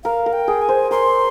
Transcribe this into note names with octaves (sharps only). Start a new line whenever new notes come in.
A#4 F5
A#4
G5
G#4
G#5
C5
A#4 C6